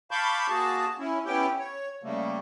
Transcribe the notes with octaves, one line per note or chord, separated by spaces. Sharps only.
F5 A5 B5 C#6 D6 G6
A#3 F#4 G#4 A5
C#4 E4
B3 C#4 E4 G4 G5
C#5
C#3 G3 A3 A#3